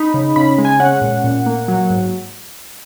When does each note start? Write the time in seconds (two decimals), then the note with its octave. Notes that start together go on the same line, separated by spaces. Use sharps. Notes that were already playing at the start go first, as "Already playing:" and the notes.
Already playing: D#4 B5
0.14 C#3
0.36 C#3 B5
0.58 G#3
0.65 G#5
0.80 C#4 F#5
1.02 A#2
1.24 A#2
1.46 A#3
1.68 F#3
1.90 G#2